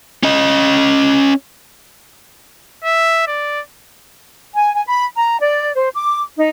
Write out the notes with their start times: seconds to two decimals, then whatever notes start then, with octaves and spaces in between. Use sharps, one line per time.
0.23 C#4 D#5
2.84 E5
3.28 D5
4.55 G#5
4.73 G#5
4.87 B5
5.16 A#5
5.41 D5
5.74 C5
5.94 D6
6.36 D#4